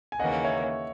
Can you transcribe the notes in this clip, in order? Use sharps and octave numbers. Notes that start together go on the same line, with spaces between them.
G#5
D#2 C#3 E3 A#3 C#4 D#5 F#5
C#5 E5